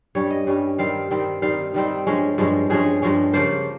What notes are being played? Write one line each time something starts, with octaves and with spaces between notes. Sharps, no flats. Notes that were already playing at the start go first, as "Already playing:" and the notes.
G2 G3 C#4 C#5
D#5
G2 G3 C#4
D#3 G3 C4 D#4 F5
D#3 G3 C4 D#4
D#3 G3 C4 D#4 F5
D#3 G3 C4 D#4
G2 F3 G#3 C#4
G2 F3 G#3 C#4
G2 F3 G#3 C#4 G#4
G2 F3 G#3 C#4
C#3 F3 A#3 F4 C5